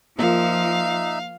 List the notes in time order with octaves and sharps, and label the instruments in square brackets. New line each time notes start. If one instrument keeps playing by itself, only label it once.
[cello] F3 [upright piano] A#3 F4 [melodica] D#4 E5 [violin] F5